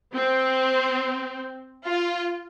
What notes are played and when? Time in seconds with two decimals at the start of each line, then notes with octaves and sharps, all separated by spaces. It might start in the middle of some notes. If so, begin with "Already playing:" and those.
0.15 C4
1.86 F4